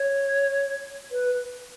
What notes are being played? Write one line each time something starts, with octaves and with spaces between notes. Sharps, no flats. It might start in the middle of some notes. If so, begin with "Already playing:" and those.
Already playing: C#5
B4